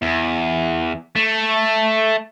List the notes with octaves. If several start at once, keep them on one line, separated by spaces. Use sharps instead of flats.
E2
A3